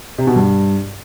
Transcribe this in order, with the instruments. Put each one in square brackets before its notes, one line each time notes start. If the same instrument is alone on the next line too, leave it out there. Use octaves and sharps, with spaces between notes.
[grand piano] C3
B2
G2